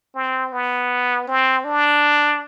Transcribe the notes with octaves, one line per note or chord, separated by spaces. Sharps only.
C4
B3
C4
D4